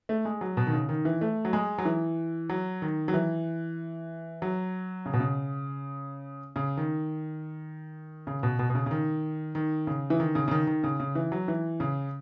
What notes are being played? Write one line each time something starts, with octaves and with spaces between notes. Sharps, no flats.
A3
G#3
F#3
B2
D#3
C#3
D#3
E3
A3
F#3
G#3
F#3
E3
F#3
D#3
F#3
E3
F#3
C#3
B2
C#3
C#3
D#3
C#3
B2
B2
B2
C#3
C#3
D#3
D#3
C#3
E3
D#3
C#3
C#3
D#3
D#3
C#3
C#3
E3
F#3
E3
C#3